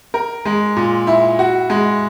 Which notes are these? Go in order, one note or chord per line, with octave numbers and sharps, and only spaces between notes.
A#4
G#3
A#2
E4
F#4
G#3